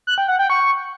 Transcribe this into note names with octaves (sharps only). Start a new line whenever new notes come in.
F#6
G5
F#5
G5
C#6